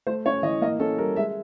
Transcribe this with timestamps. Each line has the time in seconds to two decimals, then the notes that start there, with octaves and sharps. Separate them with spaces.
0.07 A3 C5
0.26 C#4 C#5
0.43 E3 D#5
0.62 A#3 D#5
0.79 C#4 A4
0.98 G3 A#4
1.16 G#3 E5